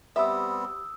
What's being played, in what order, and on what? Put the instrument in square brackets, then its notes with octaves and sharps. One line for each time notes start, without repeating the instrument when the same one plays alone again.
[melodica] G3 B3 C4 [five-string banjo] G4 E5 [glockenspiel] D#6 E6